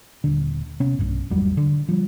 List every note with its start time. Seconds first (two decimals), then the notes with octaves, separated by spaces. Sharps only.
0.24 D#1 D3
0.80 C3 B3 C#4
0.99 B1 G2
1.30 G#1 E2 F#3 G3
1.57 D3
1.89 F3 G3